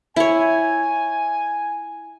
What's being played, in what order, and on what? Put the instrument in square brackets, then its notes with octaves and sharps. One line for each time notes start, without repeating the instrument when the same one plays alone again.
[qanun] E4 C#5 [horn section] G#5